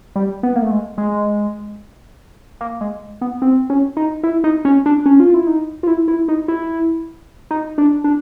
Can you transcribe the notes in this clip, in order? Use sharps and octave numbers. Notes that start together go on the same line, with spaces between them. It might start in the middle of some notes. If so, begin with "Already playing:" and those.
G3
B3
A#3
A3
G#3
G#3
A#3
G#3
B3
C4
C#4
D#4
E4
D#4
C#4
D4
C#4
F4
E4
D#4
F4
E4
E4
D#4
E4
D#4
D4
D4